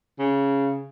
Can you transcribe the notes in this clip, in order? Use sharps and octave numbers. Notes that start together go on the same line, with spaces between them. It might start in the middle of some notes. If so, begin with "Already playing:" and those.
C#3